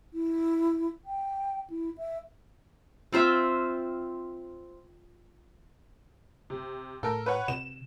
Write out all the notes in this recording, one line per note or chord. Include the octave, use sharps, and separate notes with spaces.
E4
G5
E4
E5
C4 F4 C5 E5
C3
A2 A4 A#4
B4 C#5 F#5
C3 E7